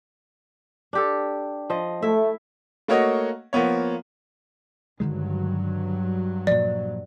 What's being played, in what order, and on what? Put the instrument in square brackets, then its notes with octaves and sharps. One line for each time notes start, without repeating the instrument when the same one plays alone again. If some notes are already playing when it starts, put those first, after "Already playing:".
[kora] D4 G4 A4
F3 D#5
[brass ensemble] A3 [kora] E4 E5
[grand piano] A3 A#3 F#4 C#5 D#5
F3 A#3 B3 C#5
[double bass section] G2 F#3 [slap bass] D3 D#3 G#3
[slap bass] A#2 F3 [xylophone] D5